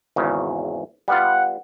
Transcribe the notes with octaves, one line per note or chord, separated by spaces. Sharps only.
G#1 E2 C#3
G3 B3 F4 F#5